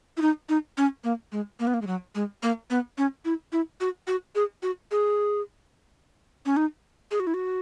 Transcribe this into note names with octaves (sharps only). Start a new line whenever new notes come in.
E4
D#4
D#4
C#4
A#3
G#3
A#3
B3
A#3
G#3
F#3
G#3
A#3
B3
C#4
E4
E4
F#4
F#4
G#4
F#4
G#4
C#4
D#4
G#4
F#4
E4
F#4